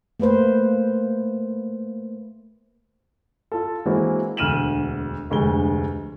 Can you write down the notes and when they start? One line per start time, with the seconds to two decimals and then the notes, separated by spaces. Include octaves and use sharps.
0.20 A3 A#3 B4 C5
3.52 F4 A4
3.85 E3 G#3 A#3 C4 E4 F#4
4.37 E1 D2 F6 D#7 E7 F#7
5.30 F1 D2 G#3 G7